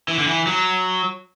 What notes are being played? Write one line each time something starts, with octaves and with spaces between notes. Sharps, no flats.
E3
D3
E3
F#3